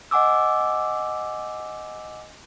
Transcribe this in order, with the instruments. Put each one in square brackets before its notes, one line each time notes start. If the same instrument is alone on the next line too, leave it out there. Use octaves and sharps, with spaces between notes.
[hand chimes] D#5 F#5 G#5 D6 E6